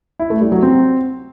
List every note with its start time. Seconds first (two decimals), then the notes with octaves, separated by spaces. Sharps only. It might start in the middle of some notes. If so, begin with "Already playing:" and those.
0.19 E4
0.30 A3
0.41 G3
0.52 F#3
0.63 C4